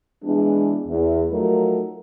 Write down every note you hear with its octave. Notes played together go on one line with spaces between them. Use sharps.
E3 G#3 B3 D4
E2
F3 F#3 A3 D#4 A#4